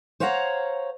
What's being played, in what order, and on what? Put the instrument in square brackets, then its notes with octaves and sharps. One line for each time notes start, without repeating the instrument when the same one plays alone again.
[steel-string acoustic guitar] C5 C#5 F5 F#5 G#5 A#5